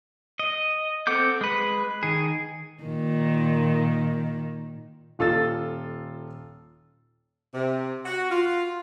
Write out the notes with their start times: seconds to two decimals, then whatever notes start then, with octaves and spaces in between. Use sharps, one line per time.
0.39 D#5
1.07 C4 A4 F#5 D6 G6
1.41 G#3 B4
2.03 D#3 G#4
2.83 A#2 D#3
5.19 D#1 F4 A4 E6 A6
7.54 C3
8.06 F#4
8.31 F4